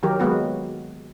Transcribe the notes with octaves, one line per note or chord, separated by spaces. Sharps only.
D#3 F#3 G4 A#4
F#3 G#3 A#3 B3 F#4